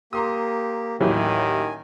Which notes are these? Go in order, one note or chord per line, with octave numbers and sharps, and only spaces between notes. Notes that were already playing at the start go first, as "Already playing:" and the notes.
A#3 G4 A#5 C6 D#6
A1 D#2 D#3 F#3 E4 G4 G#5